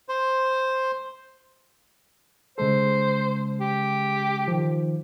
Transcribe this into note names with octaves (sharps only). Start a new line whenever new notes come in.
C5
C#3 G#3 A4 C5
G4
D#3 F3